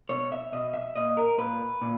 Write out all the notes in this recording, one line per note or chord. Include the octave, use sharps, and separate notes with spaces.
B2 C#5
E5
B2 D#5
E5
A#2 D#5
A#4
A#2 B4
A#2